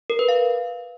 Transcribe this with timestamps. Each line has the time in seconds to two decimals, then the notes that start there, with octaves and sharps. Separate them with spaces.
0.10 A#4
0.19 B4
0.28 F5